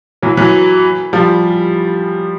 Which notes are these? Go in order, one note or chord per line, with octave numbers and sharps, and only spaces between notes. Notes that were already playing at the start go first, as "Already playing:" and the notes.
E3 F#3
E3 F#3
F3 G3